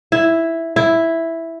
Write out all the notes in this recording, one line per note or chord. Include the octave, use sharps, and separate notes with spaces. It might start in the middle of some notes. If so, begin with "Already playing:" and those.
E4
E4